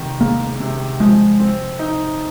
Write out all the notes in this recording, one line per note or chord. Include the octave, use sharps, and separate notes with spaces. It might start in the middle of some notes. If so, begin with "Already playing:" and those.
Already playing: C3 D#3
G#3 A#3
C3
F3 G#3
C4
D#4